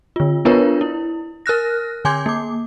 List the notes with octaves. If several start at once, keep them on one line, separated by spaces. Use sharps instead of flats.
D3 F4
B3 D4 F4 A#4 B4 C#5
E4
A#4 F6 F#6 A#6
D3 G#5 C6 D6 G6 G#6
A#3 D6